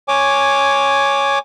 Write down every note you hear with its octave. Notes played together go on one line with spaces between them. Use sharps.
C#5 G#5 D6